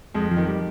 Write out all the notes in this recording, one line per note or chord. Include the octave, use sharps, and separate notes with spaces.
F2 G#3
F3
D#3
G3